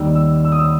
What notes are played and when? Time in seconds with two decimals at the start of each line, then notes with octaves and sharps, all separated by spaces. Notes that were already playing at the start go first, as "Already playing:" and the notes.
Already playing: D#2 D#3 G3 E6
0.15 E6
0.45 E6
0.52 D#6
0.59 E6